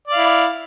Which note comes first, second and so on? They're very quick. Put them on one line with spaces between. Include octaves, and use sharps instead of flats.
D5 F5 E4